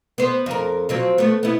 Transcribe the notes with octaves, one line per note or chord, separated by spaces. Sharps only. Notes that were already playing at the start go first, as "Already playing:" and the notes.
B3 C5
F2 A#4
F3 F#3 C4
A3 B3
B3 E4